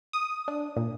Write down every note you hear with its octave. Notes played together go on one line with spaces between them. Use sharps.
D#6
D4
A#2